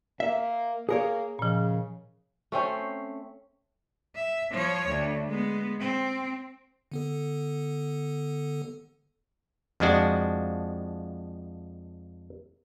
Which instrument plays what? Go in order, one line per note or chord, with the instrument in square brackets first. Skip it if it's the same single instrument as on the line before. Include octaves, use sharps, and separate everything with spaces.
[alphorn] A#3 [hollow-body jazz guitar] E5
[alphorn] A#3 [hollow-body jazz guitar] G#4 A#4 C#5
[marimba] A#2 F3 [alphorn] C#3
[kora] A3 C4 C#4 C5
[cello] E5
F3 C#5
D2
G#3 B3
C4
[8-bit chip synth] D3 B3 A4
[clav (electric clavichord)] F2 F3 G#3 D4 F#4